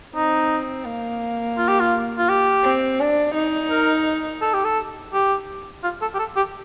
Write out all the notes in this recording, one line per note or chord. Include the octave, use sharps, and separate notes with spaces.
C4 D#4
A#3
F4
G4
F4
F4
G4
C4
D4
D#4
A#4
A4
G4
A4
G4
F4
A4
G4
A4
G4